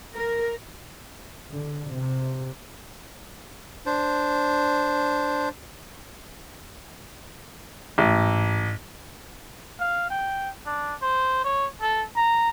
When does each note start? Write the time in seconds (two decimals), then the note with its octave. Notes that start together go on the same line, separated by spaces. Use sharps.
0.16 A#4
1.51 D3
1.90 C3
3.86 D4 C5
7.98 A1 G#2
9.80 F5
10.10 G5
10.66 D4
11.02 C5
11.44 C#5
11.81 A4
12.17 A#5